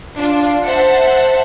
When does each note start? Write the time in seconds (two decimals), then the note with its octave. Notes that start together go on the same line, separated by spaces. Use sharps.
0.17 D4 F4
0.65 C5 E5 F#5 A5